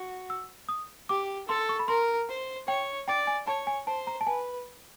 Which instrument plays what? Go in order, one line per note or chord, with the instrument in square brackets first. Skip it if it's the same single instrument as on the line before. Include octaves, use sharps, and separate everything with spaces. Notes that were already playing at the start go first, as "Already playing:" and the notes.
Already playing: [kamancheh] F#4
[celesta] E6
D#6
[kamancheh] G4 [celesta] D6
[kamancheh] A4 [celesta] C6
[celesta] C#6
B5
[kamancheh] A#4 [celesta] C6
[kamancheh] C5
[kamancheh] C#5 [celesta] G5
[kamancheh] D5 [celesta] G5
[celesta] G#5
[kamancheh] C#5 [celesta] A5
[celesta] G#5
[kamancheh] C5 [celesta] A5
[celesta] A#5
A5
[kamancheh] B4 [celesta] G#5